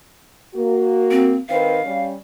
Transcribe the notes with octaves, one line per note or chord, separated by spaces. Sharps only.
A#3 F#4
C4
D#3 C4 B4 F5
G3 C#4